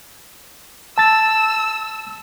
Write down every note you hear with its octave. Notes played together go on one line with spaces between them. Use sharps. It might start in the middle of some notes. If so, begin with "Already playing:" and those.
A5 E6 A6